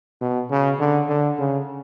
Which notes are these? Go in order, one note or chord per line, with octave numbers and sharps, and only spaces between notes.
B2
C#3
D3
D3
C#3